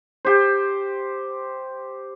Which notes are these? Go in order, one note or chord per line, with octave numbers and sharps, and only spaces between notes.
G4 C5